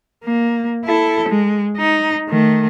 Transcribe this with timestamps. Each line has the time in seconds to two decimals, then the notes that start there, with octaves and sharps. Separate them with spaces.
0.25 A#3
0.85 E4 A4
1.29 G#3
1.77 D#4
2.29 D#3 A3